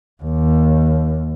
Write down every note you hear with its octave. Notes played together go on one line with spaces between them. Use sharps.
D#2